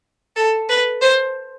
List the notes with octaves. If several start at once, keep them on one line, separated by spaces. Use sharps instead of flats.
A4
B4
C5